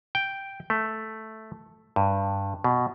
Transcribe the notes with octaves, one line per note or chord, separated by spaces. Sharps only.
G5
A3
G2
B2